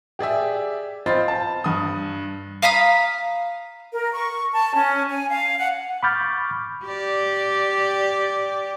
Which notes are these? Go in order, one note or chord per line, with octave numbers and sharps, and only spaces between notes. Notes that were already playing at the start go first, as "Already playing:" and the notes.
G4 G#4 D5 E5
C4 F4 C5 D#5 B5 A6
A5
G2 D#6
F5 A#5 B5 D#6
A#4
C#6
A5
C#4
G#5
F5
F#5
B5 C#6 D6 F6 G6 A6
G4 D5